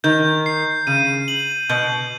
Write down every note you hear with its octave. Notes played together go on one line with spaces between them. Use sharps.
D#3 G6
C7
C#3 D#7
F#7
B2 G6